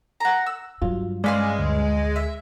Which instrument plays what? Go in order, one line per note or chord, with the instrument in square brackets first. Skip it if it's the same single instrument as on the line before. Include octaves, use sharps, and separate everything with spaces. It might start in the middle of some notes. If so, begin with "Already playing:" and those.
[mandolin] F#5 A#5
E6
[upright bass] G2 [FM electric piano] F#3 F4
[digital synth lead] G#3 [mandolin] C#4 B4 C6 [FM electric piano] D5 F5
[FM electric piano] D2
[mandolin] E5